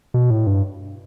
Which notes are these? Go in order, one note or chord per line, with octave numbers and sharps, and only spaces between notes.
B2
A2
G2